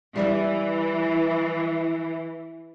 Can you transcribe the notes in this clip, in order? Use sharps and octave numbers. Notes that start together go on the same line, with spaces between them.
E3 G3 D5 E5